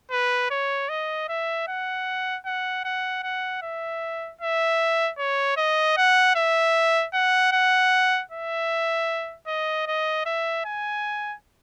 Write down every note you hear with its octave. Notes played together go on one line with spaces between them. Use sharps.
B4
C#5
D#5
E5
F#5
F#5
F#5
F#5
E5
E5
C#5
D#5
F#5
E5
F#5
F#5
E5
D#5
D#5
E5
G#5